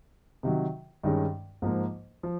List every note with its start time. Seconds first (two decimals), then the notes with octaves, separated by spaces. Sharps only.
0.43 C3 D#3 F#3
1.04 G2 D#3 G#3 C#4
1.62 G#2 F3 A#3
2.23 F3